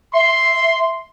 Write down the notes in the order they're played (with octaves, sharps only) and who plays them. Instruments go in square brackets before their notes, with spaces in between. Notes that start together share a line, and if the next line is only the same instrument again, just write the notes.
[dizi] E5 [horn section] C6